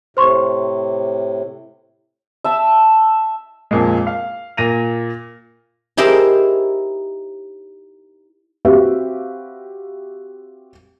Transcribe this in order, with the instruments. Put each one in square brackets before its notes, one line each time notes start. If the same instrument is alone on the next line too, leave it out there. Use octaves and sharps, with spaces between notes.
[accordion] A2 C3 [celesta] C5 C6 C#6
[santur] E5 A5 E6
[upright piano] F2 A#2 G#3
F5
A#2 A#6 D#7 F7
[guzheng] D#4 E4 G4 G#4 A#4 C5
[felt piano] C4 F#4 G4 B4 E5 F5